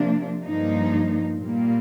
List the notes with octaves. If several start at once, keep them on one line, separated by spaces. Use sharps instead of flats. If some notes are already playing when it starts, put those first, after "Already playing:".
Already playing: C3 F3 A#3 D4
G2 F3 A#3 D#4
A#2 G3 A#3